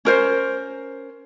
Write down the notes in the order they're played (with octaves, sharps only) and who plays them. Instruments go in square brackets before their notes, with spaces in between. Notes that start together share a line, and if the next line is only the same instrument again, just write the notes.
[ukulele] C#4 A#4 C5